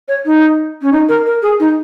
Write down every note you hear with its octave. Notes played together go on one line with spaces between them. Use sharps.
C#5
D#4
C#4
D#4
A#4
A#4
G#4
D#4